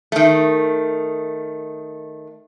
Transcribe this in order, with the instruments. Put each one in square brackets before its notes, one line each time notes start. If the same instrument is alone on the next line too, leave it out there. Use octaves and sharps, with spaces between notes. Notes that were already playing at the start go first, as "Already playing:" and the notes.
[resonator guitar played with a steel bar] D#3 A3